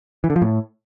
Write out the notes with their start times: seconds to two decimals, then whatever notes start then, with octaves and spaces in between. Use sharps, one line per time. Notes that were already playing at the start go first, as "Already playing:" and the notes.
0.24 E3
0.30 D3
0.36 F3
0.42 A2